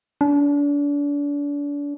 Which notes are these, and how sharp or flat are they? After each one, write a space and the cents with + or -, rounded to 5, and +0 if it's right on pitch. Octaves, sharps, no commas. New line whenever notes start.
D4 -35